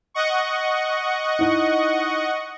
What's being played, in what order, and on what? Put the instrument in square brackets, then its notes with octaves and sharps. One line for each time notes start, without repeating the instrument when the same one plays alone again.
[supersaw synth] D#5 F#5 C#6
[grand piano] D#4 E4